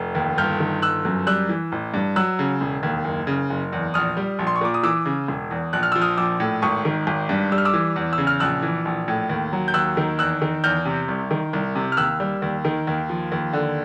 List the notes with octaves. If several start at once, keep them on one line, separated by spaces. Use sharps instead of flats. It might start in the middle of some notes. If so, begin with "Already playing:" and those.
Already playing: F1
D#2
G1 F6 G6
D#3
G1 E6 F#6
F#2
G3 E6 F#6
E3
A1
G2
F#3 E6 F#6
C#3
E1
D#2
F#1
C#3
F#1
E2
A#1 D#6 F6
G3
A#1
C6
C#6
A#2 D6
D#6
E3 D6 E6
C#3
E1
E2
A#1 F#6
F6
F3 E6
D#6 F6
A#1 D6 E6
A2
G#1 C#6 D#6
D#3
G#1
G2
G3 E6
F6
D6 E6
E3
E2
E6
C#3
F6
A#1 E6 F#6
E3
A#1
A2
D#2
F#3
G6
D#2 E6 F#6
D#3
E2 E6 F#6
D#3
E2 F6 G6
C3
C2
D#3
C2
C3
F6
D#2 E6 F#6
G3
D#2
D#3
D#2
F3
D#2
D3